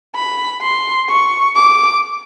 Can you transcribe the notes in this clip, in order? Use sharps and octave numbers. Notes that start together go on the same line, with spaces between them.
B5
C6
C#6
D6